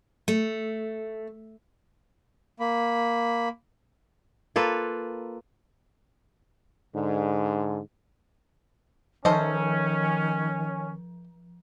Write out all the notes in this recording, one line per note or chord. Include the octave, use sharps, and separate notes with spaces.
A3
A#3 B5
A#3 F4 A4 B4
G#2 D3
D#3 F3 C#4 A4 C5 D#5